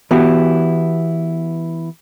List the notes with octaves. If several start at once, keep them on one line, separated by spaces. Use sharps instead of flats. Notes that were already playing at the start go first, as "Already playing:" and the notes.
E3 B3 E4 F#4 G4